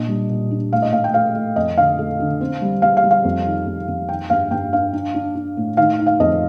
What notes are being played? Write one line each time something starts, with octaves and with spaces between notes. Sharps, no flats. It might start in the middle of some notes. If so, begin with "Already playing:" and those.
Already playing: A#2 D4 D#5
G3
A#2
D4
A2 F5
D#5
A2 F5
G5
A3 F5
A3
F2 D#5
D3 F5
A3
D3
C4
G3
G3 F5
F5
G3
F5
F2
D#3
F2
F2
D#3 G5
G2 F5
G2 G5
D4 F5
D4
D4
D4
A2
D#3 F5
D#4
F5
F2 D#5